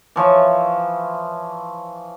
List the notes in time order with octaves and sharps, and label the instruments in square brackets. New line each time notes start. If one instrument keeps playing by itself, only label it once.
[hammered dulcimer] E3 F3 C#5 C#6